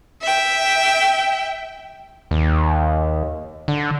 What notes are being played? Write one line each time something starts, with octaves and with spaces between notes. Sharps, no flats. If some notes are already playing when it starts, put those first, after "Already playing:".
E5 G5
D#2
D3